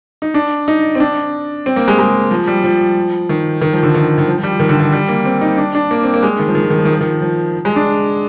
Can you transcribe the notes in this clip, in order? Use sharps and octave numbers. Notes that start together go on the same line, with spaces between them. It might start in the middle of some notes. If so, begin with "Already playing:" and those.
D#4
D4
D#4
C4
D4
C4
A#3
G#3
G#3
F3
G3
F3
D#3
D#3
F3
D3
D#3
D#3
F3
F3
G3
D#3
D3
D#3
G3
A#3
C4
D#4
D4
D4
A#3
C4
A#3
G#3
D#3
F3
D#3
F3
D#3
F3
D#3
F3
D#3
F3
G#3
D4